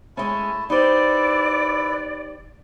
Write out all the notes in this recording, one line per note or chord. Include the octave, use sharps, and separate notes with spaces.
G#3 A3 C#4 E4 A5
D#4 E4 G4 B4 C5 D5